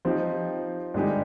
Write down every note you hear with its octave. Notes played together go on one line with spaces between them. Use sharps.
F3 C4 D#4 G4
G2 D3 G#3 D#4 G4